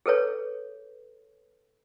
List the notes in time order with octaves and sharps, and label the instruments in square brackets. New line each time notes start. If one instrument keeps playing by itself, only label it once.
[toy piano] G#4 A4 B4 C#5